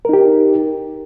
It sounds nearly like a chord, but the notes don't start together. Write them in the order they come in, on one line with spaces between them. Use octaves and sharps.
A#4 D#4 G4